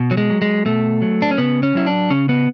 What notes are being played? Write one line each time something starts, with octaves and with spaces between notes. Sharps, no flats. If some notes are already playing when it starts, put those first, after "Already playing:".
Already playing: B2
F#3
G#3
F#3
G#3
B2 A3
F#3
D4
C#4
C#3 B3
C#4
F#3 E4
D4
C#3 C#4
B3